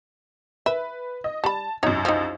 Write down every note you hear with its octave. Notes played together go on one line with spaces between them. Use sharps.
B4 E5
D#5
G3 A5 B5
C2 F#2 D#4 C#5
F3 D#4